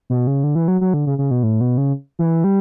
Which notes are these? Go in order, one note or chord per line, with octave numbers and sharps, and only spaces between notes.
B2
C#3
D3
E3
F#3
F#3
D3
C#3
C#3
B2
A2
B2
C#3
E3
G3